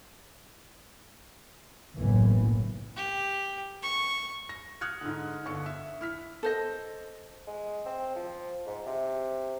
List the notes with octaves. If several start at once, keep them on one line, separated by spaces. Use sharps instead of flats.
F#1 B1 A2 E3
G4
C#6
A#6
D#6 F6 F#6 G#6 C#7
G#2 D3
G1 D3 C#6 C#7
E5
E4 F6 B6
A4 C5 D#5
G#3
C4
F3
G#2
C3